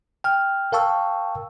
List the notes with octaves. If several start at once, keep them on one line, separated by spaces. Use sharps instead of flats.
G5 F6
A#4 F5 G5 A5 C#6 E6